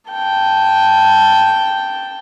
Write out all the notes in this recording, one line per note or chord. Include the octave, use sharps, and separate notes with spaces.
G5 A5